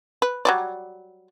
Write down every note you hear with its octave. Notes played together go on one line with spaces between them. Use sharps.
B4
F#3 G3 D5